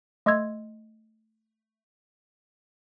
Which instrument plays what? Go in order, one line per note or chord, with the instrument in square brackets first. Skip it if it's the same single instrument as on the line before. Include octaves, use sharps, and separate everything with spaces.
[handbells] A3 D#5 C6 E6 G#6